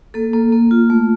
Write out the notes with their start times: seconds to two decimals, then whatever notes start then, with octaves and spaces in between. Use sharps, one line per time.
0.14 A#3 A4
0.33 A#3
0.52 A#3
0.71 F4
0.90 A3